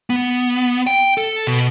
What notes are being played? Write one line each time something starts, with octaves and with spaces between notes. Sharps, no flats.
B3
G5
A4
B2